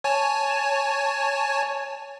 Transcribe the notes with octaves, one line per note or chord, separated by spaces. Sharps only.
C#5 G#5 A5